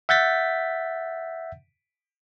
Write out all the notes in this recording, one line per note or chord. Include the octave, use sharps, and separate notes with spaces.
E5 F#5 G6 A6 B6